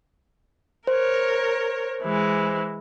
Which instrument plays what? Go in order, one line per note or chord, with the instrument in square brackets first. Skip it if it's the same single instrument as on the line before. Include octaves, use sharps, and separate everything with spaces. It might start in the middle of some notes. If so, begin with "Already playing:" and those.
[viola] A#4 C#5 [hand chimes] C5
[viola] E3 G#3